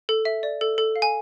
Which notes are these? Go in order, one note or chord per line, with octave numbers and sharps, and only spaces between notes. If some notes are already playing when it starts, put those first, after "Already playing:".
A4
E5
D5
A4
A4
F5
G#5